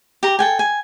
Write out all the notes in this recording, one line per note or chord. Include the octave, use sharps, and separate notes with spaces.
G4 A#5
A4 G5 G#5
G#5